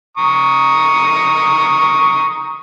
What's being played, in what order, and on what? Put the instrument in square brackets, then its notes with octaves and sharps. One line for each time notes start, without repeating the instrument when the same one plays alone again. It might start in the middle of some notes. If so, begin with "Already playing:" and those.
[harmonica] A#5 C#6 D#6